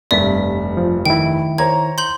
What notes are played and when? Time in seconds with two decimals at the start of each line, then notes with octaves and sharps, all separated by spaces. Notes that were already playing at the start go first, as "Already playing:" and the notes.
0.11 F1 G2 D5 E5 B6
0.77 F3
1.06 D#3 E4 G5
1.58 C5 C#5 A#5 G#6
1.98 C6 G6 F#7